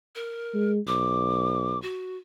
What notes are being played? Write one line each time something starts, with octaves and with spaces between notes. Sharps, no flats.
A#4
G#3
B1 D6
F#4